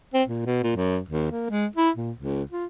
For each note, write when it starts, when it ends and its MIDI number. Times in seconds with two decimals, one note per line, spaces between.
0.14 0.23 60
0.28 0.43 46
0.46 0.61 47
0.63 0.71 46
0.76 0.99 42
1.09 1.29 39
1.32 1.49 58
1.50 1.66 56
1.76 1.90 64
1.96 2.12 46
2.18 2.43 37
2.51 2.66 65